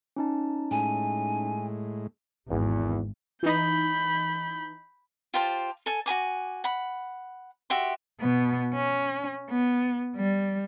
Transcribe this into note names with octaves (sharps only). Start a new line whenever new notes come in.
C#4 D#4 A5
A2 G#3 G#5
G#1 E2
E3 D#4 B5 G6
F4 G4 C5 A5
A4 G#5
F#4 A#4 G#5 D6
F#5 B5
F#4 G4 E5 C6
B2 B3
C#4
B3
G3